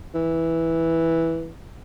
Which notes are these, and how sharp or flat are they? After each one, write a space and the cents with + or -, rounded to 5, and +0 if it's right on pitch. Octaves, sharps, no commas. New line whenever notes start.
E3 -5